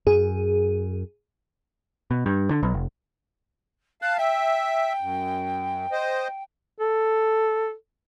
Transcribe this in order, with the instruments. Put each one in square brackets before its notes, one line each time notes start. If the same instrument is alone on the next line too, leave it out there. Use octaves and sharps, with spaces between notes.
[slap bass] F#2 [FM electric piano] G#4
[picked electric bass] B2
G2
D3
B1
F1
[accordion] F5 A5 [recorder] F#6
[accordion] E5 [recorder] G5
[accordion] F#2
C5 D#5
[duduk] A4